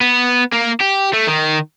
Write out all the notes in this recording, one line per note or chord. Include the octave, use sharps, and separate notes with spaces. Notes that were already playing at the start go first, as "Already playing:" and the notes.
B3
A#3
G4
A3
D#3